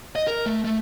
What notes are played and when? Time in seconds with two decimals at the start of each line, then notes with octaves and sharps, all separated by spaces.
0.16 D#5
0.27 A#4
0.46 A3
0.65 A3